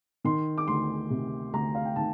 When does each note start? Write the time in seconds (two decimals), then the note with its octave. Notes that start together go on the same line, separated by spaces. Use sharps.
0.24 D#3 C6
0.58 D6
0.68 D2 C6
1.10 C3
1.53 D2 A#5
1.75 F5
1.85 G5
1.96 D#3 A5